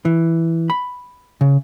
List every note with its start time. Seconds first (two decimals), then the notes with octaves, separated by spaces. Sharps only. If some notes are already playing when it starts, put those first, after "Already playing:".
0.05 E3
0.70 B5
1.41 C#3